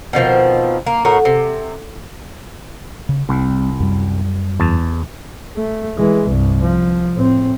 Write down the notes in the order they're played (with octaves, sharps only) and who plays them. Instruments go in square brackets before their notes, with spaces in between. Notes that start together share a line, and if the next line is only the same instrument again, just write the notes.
[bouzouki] B2 D#3 F3 C4
A#3
A2 F#4 A#4
C3
[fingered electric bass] C#3
[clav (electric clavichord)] C2 [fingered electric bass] G3 C4
[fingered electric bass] F#2 G3
[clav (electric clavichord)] E2 A5
[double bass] A3
E3 G#3
C2 G2
F3
A2 C4